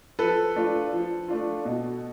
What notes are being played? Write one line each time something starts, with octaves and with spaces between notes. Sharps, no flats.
F3 A4 B4
A3 D4 F4
F3
A3 D4 F4
B2